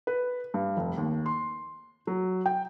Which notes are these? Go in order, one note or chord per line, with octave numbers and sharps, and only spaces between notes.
B4
G2
F1
D#2
C6
F#3
G5